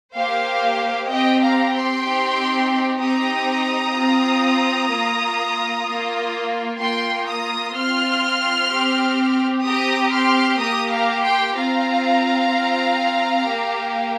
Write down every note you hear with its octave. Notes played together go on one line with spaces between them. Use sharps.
A#3 G4 C5 F5
C4 G4 D#5 G5
F5 A#5
G5 C6
C4 D#4 G4
C4 D#4 G4 A#5 D#6
C4 F4
A#3 F4
A#3 F4
A#3 F4 G5 C6
A#5 D#6
C4 F4 C6 F6
C4 G4
C4 G4 A#5 D#6
C6 F6
A#3 G4 A#5 D#6
F5 A#5
G5 C6
C4 F4 F5 A#5
C4 F4
A#3 G4